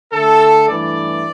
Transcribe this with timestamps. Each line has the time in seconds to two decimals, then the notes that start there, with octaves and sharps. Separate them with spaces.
0.13 D3 A3 A4
0.69 G2 E3 A3 D5